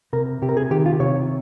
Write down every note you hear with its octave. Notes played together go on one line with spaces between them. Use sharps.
C3 A#4
C3 G4
A#4
G#4
D#3 G4
F4
C3 C#5